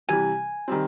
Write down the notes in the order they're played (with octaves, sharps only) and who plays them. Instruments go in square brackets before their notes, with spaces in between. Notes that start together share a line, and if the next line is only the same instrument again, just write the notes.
[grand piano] C3 E3 G3 [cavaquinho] G#5
[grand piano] D#3 G3 C4